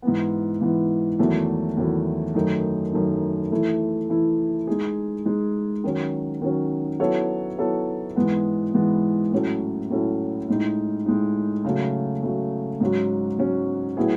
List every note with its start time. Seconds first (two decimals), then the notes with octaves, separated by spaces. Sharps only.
0.02 G#2 E3 B3
0.61 G#2 E3 B3
1.19 E2 D#3 F#3 A3 E4
1.77 E2 D#3 F#3 A3 E4
2.35 F#2 D#3 A3 D#4
2.93 F#2 D#3 A3 D#4
3.51 E3 A3 E4
4.09 E3 A3 E4
4.67 G#3 D#4 G#4
5.26 G#3 D#4 G#4
5.84 D#3 F#3 C#4
6.42 D#3 F#3 C#4
7.00 F#3 B3 E4 A4 C#5
7.58 F#3 B3 E4 A4 C#5
8.16 G#2 E3 G#3 B3
8.74 G#2 E3 G#3 B3
9.32 A2 F#3 C#4 E4 A4
9.90 A2 F#3 C#4 E4 A4
10.48 A2 G#3 D#4
11.06 A2 G#3 D#4
11.65 C#3 F#3 A3
12.23 C#3 F#3 A3
12.81 G#2 F#3 C#4 F#4
13.39 G#2 F#3 C#4 F#4
13.97 A2 F#3 B3 E4 G#4